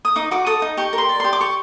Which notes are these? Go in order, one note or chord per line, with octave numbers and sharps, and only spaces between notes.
D#6
D#4 D6
F#4 D6
A4 D#6
D#4
G4 C#6
A#4
C6
D5
G4 C6
D6
G4 C#6